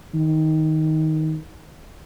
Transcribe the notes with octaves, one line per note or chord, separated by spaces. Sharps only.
D#3